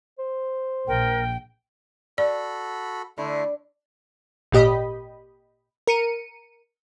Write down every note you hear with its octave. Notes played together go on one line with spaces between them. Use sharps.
C5
A#1 A#4 G5
F#4 A4 D5 B5
D3 A3 E4
G#1 A#2 G4 D#5 B5
A#4 C#7 D#7